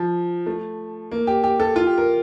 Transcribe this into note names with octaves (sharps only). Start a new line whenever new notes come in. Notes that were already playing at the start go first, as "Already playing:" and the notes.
Already playing: F3
A3
A#3
G4
G4
A4
F4
G4
A#4